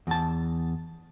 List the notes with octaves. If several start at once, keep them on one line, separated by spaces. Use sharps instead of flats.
E2 A5